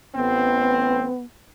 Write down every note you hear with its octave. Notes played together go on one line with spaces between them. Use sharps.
A1 B3 C4